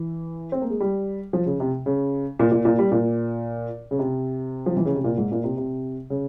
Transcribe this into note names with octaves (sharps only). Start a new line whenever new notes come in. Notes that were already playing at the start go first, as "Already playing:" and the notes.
Already playing: E3
C4
A#3
G#3
G3
F3
C#3
C3
C#3
A#2
A#2
A#2
G3
A#2
C#3
C3
F3
E3
C#3
C3
A#2
G#2
A#2
C3
C3
C#3